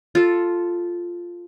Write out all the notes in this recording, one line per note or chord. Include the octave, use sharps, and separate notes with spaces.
F4 A4